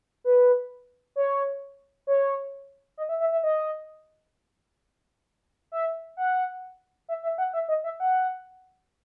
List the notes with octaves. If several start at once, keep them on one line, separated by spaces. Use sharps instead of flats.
B4
C#5
C#5
D#5
E5
E5
E5
D#5
E5
F#5
E5
E5
F#5
E5
D#5
E5
F#5